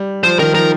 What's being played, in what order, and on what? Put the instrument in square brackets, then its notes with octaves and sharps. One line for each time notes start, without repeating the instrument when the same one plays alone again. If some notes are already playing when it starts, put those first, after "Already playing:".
Already playing: [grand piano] G3
[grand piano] F3 [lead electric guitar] C5
[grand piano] D#3 [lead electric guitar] A#4
[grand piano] F3 [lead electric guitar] A#4